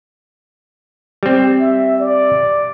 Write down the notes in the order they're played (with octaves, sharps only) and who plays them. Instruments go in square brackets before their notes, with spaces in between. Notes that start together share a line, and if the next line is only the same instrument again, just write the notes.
[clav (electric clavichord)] G3 C4
[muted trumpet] E5
D5